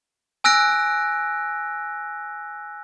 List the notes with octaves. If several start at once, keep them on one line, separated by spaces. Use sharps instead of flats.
G#5 E6 F#6 A#6 D7